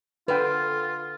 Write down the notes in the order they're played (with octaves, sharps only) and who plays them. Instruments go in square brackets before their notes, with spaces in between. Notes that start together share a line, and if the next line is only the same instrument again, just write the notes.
[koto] D3 [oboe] F4 [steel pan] B4 G5